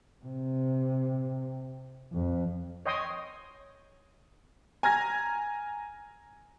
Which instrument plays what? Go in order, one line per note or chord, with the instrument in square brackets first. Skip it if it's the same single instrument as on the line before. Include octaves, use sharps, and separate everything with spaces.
[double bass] C3
F2
[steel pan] C#5 D#5 G5 C6 D#6
[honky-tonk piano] G#5 A#5 F6 G#6 A#6